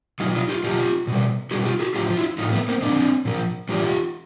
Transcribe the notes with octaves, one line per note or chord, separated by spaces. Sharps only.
B2 F#3 D#4 F4
D#4 F4
F4 G4
B2 F#3 F4 G4
B2 G3
B2 G3 F#4 G#4
F4 G4
F#4 G#4
A2 F3 F4 G4
F4
E4 F#4
A2 F3 D#4 F4
A3 B3
A#3 C4
A#2 F3 C4 D4
A#2 F3
A2 E3 G3 F4 G4